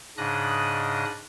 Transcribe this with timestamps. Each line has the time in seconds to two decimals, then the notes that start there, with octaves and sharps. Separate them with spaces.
0.17 G#2 C#3 D4 D#5 D#6 F#6